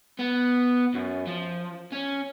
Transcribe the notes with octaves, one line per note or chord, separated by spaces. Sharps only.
B3
F#2
F3
C#4